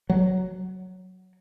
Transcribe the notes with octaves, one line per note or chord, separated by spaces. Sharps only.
F#3